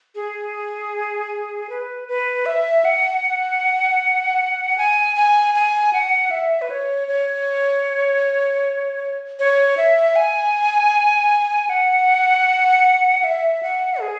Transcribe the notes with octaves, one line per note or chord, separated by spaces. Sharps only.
G#4
B4
B4
E5
F#5
G#5
G#5
G#5
F#5
E5
B4
C#5
C#5
C#5
E5
G#5
F#5
E5
F#5
G#4